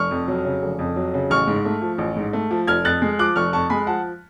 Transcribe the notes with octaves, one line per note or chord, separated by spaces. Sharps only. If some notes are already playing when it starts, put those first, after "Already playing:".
Already playing: F1 C#6 F6
F2
F#3
C#3
F1
F2
F#3
C#3
A1 C#6 F6
G#2
A3
F3
A1
G#2
A3
F3
F1 F6 G#6
F2 F#6 A6
G#3
F3 D6 F#6
F1 C#6 F6
F2 A5 C#6
G#3 G#5 B5
F3 F#5 A5